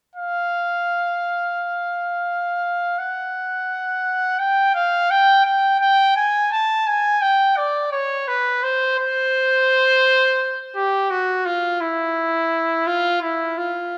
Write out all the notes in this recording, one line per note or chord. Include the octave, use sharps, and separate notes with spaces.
F5
F#5
G5
F5
G5
G5
G5
G#5
A5
G#5
G5
D5
C#5
B4
C5
C5
G4
F#4
F4
E4
F4
E4
F4